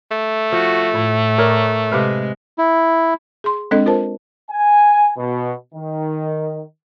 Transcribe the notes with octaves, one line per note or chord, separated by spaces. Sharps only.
A3
F3 F#4
A2 E4
A#4 C#5 D5
C3 G#3 B4 F5
E4
G#4 C6
G#3 C4 D4 A4 D#5
F4 A#4 C5 A5
G#5
B2
D#3